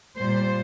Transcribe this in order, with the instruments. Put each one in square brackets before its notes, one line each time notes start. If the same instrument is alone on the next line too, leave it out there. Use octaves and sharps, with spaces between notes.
[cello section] A#2 G3 C5